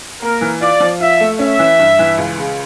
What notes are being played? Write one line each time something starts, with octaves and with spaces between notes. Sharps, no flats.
A#3 A#4
E3
F4 D5
F3
F4 E5
A3
C#4 E5
E3
G2
E3
C#2
C#3